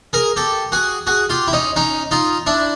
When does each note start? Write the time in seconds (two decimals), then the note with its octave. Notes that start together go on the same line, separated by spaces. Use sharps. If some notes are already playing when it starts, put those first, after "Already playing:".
0.13 G#4 A#4
0.36 G4 A4
0.72 F#4 G#4
1.07 F#4 G#4
1.30 F4 G4
1.48 E4
1.53 C#4 D#4
1.76 C#4 D#4
2.11 D#4 F4
2.46 D4 E4